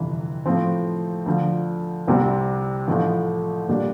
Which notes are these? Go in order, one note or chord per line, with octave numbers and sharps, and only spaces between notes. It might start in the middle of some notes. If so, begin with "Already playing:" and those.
Already playing: G1 F2 C3 E3
A2 F3 C4
D2 D3 F3
C2 C3 G3 C4
A1 A2 F3
A#2 G3 D4